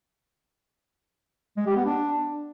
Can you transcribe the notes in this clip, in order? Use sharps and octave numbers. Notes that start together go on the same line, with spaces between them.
G#3
G4
B3
D4